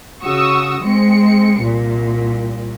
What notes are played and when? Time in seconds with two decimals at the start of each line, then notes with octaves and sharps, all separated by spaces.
0.22 C#3 F#4 C#6 D#6 E6
0.82 G#3 C4 C#7
1.61 C2 A#2